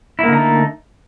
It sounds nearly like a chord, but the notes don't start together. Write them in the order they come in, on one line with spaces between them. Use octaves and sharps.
E4 A#3 D3 D#4 A3